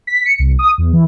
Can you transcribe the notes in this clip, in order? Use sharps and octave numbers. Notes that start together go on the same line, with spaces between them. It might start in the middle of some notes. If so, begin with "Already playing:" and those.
B6
C#7
C2
D#6
E2
E3